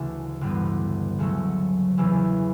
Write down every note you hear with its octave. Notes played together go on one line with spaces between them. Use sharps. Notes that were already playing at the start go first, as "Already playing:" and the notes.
Already playing: D2 C#3 E3 A3 D4
A1 G2 D3 G3 B3
D2 C#3 F#3 A3
E2 C#3 E3